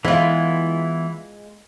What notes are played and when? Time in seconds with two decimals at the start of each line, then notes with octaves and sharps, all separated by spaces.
0.05 E3 G#3 B3 E4 F4